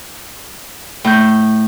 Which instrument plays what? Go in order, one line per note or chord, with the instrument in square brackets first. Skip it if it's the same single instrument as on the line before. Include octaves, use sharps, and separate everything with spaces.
[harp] A2 G6